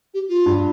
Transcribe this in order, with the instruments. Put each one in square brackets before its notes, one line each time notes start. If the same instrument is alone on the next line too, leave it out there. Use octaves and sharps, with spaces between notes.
[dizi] G4
F4
[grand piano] G2